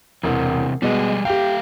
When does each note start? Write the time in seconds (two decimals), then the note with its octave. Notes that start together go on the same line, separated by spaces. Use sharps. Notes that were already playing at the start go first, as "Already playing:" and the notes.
0.23 E1 C3 E3
0.82 B2 G3 G#3 G#4
1.25 A3 G4 F5 G5